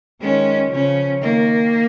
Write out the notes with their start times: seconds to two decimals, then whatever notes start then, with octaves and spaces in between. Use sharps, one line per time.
0.21 D#3 G#3 C#4
0.71 C#3 F3 C#4
1.22 D#3 A#3